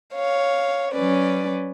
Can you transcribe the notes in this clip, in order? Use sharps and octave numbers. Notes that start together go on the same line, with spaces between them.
C#5 F5
F#3 C#4 B4 D5